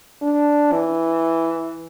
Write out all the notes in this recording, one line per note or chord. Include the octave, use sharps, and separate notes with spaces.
D4
E3